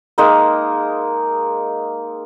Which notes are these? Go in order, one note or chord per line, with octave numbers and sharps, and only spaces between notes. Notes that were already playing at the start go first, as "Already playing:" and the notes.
G#3 A#3 D#4 A#4